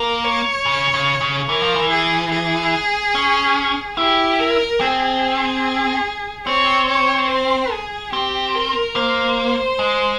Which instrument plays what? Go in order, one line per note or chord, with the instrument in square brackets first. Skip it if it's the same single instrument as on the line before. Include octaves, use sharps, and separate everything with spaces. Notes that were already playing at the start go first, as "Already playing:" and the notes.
Already playing: [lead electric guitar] A#3 [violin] A#4
[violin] C#5
[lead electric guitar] C#3
C#3
C#3
[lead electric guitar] E3 [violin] A#4
[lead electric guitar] F3
E3
[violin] G#4
G#4
[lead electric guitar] C#4
[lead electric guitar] E4 [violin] G4
[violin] A#4
[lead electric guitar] C4 [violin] G#4
[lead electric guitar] C4 [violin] C#5
[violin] C#5
C5
G#4
[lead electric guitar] C4 [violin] G4
[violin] A#4
[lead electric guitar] A#3 [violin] C5
[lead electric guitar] G#3